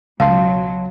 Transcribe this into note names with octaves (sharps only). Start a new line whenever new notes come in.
C#2 B2 F#3 F5 A5 C6